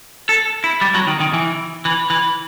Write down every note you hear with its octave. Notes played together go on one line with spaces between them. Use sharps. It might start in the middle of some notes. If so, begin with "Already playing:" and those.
A4
E4
G3
F#3
D#3
D#3
E3
E3
E3